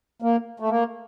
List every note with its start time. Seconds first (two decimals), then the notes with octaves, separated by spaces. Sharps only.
0.22 A#3
0.60 A3
0.69 A#3